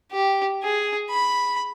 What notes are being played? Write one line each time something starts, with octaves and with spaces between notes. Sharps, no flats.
G4
G#4
B5